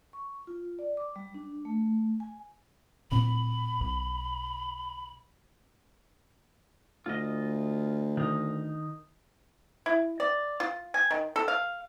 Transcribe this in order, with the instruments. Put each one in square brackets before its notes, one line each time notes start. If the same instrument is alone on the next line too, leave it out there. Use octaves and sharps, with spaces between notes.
[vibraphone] C#6
F4
D5
D6
G3
D4
A3
G#5
[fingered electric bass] D1 A#2 C4 [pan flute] B5
[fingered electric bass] B1
[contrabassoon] D2 [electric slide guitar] F4 D#5
[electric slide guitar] D#3 D#4
[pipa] E4
D5
F4
G#5
D#3
A4
F5